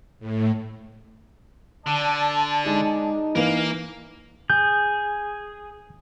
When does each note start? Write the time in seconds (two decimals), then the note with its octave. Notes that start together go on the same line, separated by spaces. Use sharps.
0.20 A2
1.86 D3 D5 A5
2.66 G#3 D#4
3.35 E3 A#3 A#4 B4 F5
4.50 G#4 G6